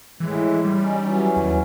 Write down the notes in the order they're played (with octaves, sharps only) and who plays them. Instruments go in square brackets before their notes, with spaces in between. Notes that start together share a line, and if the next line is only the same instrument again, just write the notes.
[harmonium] A2 G#3 [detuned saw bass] E3
[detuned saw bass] G3
[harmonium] C#4 D#4
E3 F#3 C#4
[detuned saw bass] D#2